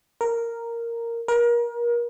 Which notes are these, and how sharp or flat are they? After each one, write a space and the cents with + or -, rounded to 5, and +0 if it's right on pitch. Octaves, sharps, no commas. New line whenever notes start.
A#4 -5
A#4 +30